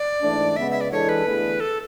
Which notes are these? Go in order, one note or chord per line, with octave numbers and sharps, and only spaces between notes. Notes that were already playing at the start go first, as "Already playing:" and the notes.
Already playing: D5
G#2 E3 A3 D4
C#3 G#3 B3 E5
E5
D5
E3 G#3 D4 A4 C#5
B4
E2 D3 A3 E4 G#4
A4